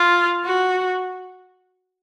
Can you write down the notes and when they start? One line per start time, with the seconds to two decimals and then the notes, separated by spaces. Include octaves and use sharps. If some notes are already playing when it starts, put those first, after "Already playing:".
Already playing: F4
0.45 F#4